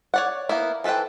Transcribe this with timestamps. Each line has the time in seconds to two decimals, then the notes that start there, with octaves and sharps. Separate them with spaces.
0.14 C#5 D5 F#5
0.49 A#3 B3 E4
0.84 E3 A4 B4 C5 G5